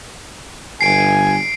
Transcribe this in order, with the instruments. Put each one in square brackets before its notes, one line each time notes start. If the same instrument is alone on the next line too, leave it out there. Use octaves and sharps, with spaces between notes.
[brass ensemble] G1 G#5 [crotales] C7 D7